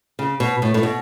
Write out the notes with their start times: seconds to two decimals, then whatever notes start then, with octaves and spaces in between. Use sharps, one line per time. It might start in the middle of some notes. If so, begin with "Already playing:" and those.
0.19 C#3
0.40 B2
0.62 A2
0.74 A2
0.83 B2